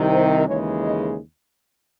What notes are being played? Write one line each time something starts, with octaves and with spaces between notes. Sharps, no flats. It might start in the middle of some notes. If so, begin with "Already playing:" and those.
Already playing: C2 C3 D#3
C5
D#2 C#3 E3 G#3 C#5
D#5